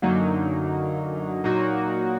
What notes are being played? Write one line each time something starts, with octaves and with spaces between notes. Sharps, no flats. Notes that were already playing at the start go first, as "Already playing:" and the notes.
F#2 D3 F#3 A#3 D#4
A#2 F#3 A#3 D#4 F#4